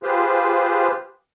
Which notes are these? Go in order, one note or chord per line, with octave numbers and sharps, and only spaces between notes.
F4 G4 G#4 B4 C5